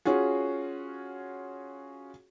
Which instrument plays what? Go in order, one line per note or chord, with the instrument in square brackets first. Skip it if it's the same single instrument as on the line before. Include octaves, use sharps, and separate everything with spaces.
[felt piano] C#4 F4 F#4 G#4